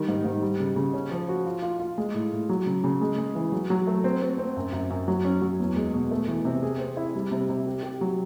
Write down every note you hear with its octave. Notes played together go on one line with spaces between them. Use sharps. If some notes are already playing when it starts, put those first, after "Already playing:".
Already playing: D#3 G3
G#2
G#2
G3
C#3
C#3
C#4
F3
F#4
F4
F4
F4
G#3
A2
A2
F#3
C#3
C#3
G#3
G#3
E3
F#3
F#3
A3
C4
C4
C4
F#2
F#2
F#2
F#3
C#4
F#3
E2
G#3
B2
A3
E3
C3
G#4
C4
E4
G3
C3
C3
G4
G4
F#3